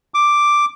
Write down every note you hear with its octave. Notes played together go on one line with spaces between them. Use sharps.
D6